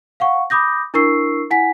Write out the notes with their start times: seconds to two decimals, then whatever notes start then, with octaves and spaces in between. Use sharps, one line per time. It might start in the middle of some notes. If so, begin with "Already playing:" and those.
0.20 F5 F#5 C#6
0.50 B5 D6 D#6 G6 A#6
0.94 D4 E4 A#4 C#6 E6 C7
1.51 E4 F#5 G#5 B6